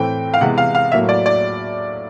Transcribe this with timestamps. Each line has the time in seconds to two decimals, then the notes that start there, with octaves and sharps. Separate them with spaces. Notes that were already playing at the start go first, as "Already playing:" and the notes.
Already playing: A2 E3 A3 C4 G5
0.34 F5
0.41 C3 E3 G#3 B3 F#5
0.58 F5
0.75 F5
0.92 A2 F#3 A#3 E5
1.09 D5
1.26 D5